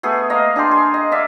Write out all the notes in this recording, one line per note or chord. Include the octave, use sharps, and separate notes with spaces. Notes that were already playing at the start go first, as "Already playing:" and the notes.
A3 B3 G#4
A#3 A#4 D#5 F5
D4 G#4 G5 C6
G#4
D#5
D5 E5 F5